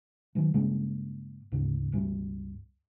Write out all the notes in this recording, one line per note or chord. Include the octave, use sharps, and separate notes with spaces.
D#3 F#3
G2 C#3 G#3 A#3
D2 G#2 C#3
C#2 G2 G3